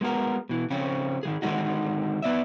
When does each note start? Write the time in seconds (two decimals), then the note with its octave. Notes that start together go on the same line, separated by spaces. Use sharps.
0.01 G#3 B3 F#4 A#4
0.49 B2 E3
0.70 C#3 F3 C4 C#4
1.23 D#3 F3 G#4
1.42 D3 D#3 G#3 C#4 D#4 F#4
2.22 B3 D5 E5